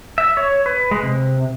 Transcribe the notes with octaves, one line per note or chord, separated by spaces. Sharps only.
E5
C#5
B4
G#3
C3